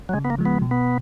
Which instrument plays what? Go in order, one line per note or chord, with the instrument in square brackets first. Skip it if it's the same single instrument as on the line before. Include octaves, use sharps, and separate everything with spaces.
[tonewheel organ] F#3
[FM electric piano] C#3 [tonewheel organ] G#3
[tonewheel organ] B3
A#3
[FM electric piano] F3 G#3
[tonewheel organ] B3
[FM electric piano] B2
[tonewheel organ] B3